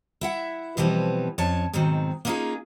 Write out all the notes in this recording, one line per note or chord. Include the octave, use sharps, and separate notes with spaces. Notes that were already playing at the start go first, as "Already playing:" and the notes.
E4 E5 F#5
B2 E3 F3 G3 B3 C4
F2 C#4 C#5 A5
G#2 B2 D#3 F#3 C4
A#3 B3 C#4 D#4 F4 G#4